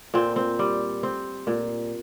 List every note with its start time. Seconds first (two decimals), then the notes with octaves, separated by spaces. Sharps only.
0.14 A#2 C4
0.36 C4
0.59 G3
1.03 C4
1.47 A#2